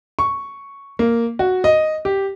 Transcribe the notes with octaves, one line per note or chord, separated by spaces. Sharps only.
C#6
A#3
F#4
D#5
G4